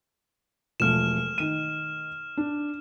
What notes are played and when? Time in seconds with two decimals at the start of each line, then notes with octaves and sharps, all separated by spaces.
0.80 E1 F3 A3 F6 E7
1.38 D#3 D#7
2.37 D4